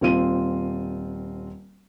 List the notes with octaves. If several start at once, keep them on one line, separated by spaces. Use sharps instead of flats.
D#1 C4 F4 D#7